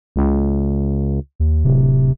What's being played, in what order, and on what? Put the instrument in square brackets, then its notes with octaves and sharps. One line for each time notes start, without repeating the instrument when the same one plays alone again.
[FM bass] C#2
[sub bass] D#2
[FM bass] D1 [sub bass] C3